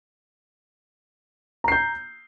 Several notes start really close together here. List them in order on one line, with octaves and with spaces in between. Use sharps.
A#5 C7 G6